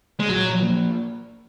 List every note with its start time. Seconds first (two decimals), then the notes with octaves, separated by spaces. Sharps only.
0.20 G#3
0.29 A#2 F#3
0.62 F3 A#3